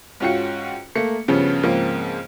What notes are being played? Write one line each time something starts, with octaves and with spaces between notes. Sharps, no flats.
G#2 C#4 F4 F#4 G5 C#7
A3 A#3 C#7
G2 C#3 F3 B3 C#4
G#2 C#3 F3 A#3 C4